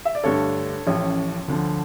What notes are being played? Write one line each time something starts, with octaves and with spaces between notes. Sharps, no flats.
E5
D5
G2 D3 A3 A4 C#5
A1 A2 F3 C#4
D2 D3 F3